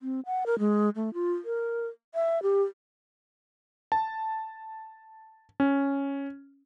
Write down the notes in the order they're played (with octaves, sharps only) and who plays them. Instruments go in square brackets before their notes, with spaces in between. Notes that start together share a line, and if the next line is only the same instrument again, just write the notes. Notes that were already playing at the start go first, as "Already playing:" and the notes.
[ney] C4
F#5
A#4
G#3
A3
F4
A#4
E5
G4
[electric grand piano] A5
C#4